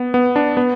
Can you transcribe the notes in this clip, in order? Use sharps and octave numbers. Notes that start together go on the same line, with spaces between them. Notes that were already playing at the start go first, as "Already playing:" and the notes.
Already playing: B3
B3
D4
B3